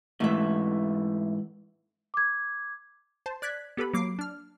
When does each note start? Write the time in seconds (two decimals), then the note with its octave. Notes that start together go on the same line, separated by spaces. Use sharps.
0.20 G#2 E3 A3 E5
2.14 D6 G#6
3.26 C5 A5
3.42 D5 F#6 G#6 B6
3.77 B3 G4 A4 B4 B5
3.93 F#3 A#3 D6 C7
4.19 D4 F6